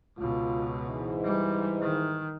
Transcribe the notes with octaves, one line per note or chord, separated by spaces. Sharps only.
C#2 B2 F4
G#2 E3
G3
D#3